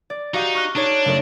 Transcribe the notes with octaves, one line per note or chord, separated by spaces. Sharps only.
D5
D#4 F#4 G4 F5
C#6 F6 F#6
D4 D#4 G#4 C#5
F#1 A3 A#4